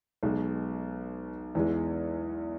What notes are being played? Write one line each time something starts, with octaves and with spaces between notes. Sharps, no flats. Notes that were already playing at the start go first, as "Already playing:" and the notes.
B1 B2 G#3
E2 E3 G#3